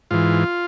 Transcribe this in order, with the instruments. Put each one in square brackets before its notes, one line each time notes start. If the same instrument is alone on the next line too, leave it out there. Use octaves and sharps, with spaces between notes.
[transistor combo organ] G#2 E3 F4